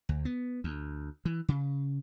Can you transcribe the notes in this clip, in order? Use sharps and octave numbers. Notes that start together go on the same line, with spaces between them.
D2
B3
D2
E3
C#3